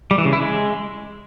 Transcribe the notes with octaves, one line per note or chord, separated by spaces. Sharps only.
G3
E3
C#3
E4
G#3